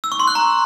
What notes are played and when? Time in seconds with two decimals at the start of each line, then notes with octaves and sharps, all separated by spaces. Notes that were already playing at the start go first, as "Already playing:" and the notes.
0.04 E6
0.12 C#6
0.20 C6
0.27 F#6
0.35 A#5